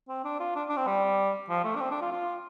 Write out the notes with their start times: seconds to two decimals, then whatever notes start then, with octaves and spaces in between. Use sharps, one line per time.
0.09 C4
0.24 D4
0.40 F4
0.56 D4
0.69 D4
0.77 C4
0.87 G3
1.49 F3
1.64 A3
1.76 D4
1.80 C4
1.91 D4
2.02 F4
2.12 F4